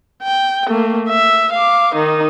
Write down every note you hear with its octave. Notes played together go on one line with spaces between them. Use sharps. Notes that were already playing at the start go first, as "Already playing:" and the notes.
G5
A3 A#3
E5
F5 D6
D#3 D#4